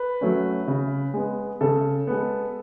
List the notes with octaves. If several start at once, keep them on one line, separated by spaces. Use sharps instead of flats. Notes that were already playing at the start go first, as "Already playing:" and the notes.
Already playing: B4
F#3 A3 C#4
C#3
G#3 B3
C#3 A4
G#3 B3